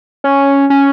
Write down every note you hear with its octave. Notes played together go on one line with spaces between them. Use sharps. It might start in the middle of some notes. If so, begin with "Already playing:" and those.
C#4
C#4